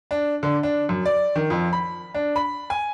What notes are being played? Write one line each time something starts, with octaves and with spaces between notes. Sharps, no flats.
D4
D3
D4
F#2
D5
D#3
F2
B5
D4
B5
G#5